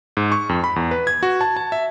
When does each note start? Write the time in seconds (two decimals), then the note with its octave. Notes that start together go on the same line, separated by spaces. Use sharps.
0.17 G#2
0.32 C#6
0.49 F2
0.64 B5
0.76 E2
0.91 B4
1.07 G#6
1.23 F#4
1.41 A5
1.56 A5
1.72 E5